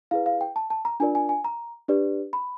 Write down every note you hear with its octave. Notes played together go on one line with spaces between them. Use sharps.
E4 G#4 B4 F5
F5
G5
A5
A5
A#5
D4 F4 A#4 D5 G#5
G#5
G#5
A#5
D4 G4 B4 D5
B5